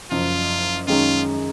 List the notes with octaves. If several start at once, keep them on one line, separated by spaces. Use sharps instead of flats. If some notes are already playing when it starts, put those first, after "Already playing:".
F#1 F#2 F3 F4
F#2 D#3 G#3 C#4 F4